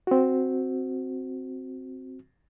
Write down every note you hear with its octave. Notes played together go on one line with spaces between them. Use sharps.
C4 F#4